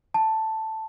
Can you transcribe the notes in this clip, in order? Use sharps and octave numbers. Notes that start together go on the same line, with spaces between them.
A5